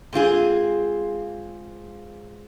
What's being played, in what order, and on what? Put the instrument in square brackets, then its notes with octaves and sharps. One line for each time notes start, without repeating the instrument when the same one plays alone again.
[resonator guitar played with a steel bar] G#2 C4 F4 G#4